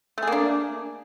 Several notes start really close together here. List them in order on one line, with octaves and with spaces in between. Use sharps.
A3 G#4 A#3 D4